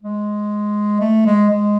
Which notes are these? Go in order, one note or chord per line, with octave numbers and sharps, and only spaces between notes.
G#3
A3
G#3
G#3